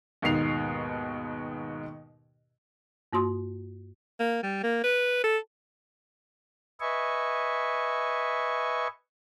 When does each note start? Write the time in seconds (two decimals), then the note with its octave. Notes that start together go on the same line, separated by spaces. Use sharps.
0.22 D#2 G#2 B2 C7 F7
3.13 G2 A#3 F#4 C6 D#6
4.20 A#3
4.43 G3
4.63 A#3
4.84 B4
5.24 A4
6.80 B4 D#5 E5 G#5 C#6